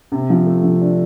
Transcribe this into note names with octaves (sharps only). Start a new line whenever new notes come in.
C3
F3
A3
F3
D4